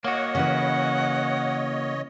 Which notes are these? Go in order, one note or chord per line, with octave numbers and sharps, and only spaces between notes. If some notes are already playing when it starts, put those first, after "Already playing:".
A#3 F#4 C#5 D#5 F#5
C#3 E3 B4 F#5